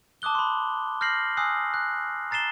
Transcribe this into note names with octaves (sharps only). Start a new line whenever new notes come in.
A5 D6 D#6 F#6 G7
B5 C6
F6 G6 A#6 C7 F#7
G#5 D#6 E6 F#6 C7
F#6
A#5 A6 C7 E7 G7